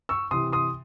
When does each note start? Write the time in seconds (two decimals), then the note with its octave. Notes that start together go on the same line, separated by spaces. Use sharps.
0.09 C#6 E6
0.31 C3 E3 C6 D#6
0.52 C6 D#6